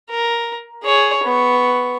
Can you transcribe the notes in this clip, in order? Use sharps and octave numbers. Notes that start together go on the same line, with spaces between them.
A#4
G#4 C#5
B3 C#6